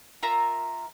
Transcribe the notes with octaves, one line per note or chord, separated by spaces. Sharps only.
F4 A#4 E5 A#5